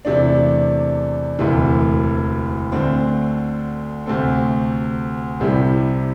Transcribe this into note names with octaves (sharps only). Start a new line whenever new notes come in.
E2 C3 A3 D4
E1 D2 C3 E3
D2 D3 A3 C4
D2 C3 A3 C4 A4
C2 C3 G3 E4 G4